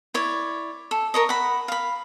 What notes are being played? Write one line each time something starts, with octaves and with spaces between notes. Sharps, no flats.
E4 C#5 D5
A4
A#4 C#5 D#5
F#5 B5
F5 B5